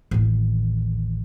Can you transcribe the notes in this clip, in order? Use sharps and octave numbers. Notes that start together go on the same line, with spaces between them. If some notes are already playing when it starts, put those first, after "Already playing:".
A1 D#2